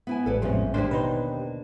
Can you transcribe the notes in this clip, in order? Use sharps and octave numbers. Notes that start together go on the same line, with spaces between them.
B3 E4 G#5
A1 G3 A4 B4 D5
E2 G#2 C3 F3 C#4
D#2 D3 A#3 D4 G4 C5
B2 D#4 B4 C5